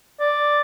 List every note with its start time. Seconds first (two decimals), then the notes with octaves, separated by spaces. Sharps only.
0.20 D5